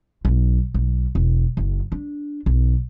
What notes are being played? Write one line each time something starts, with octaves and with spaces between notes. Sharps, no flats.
B1
B1
E1
F#1
D4
B1